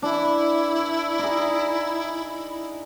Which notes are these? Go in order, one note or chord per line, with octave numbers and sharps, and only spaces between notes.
E3 D4 E4
D#4 G#4